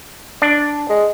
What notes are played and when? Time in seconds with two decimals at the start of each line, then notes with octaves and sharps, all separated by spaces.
0.42 D4
0.90 G#3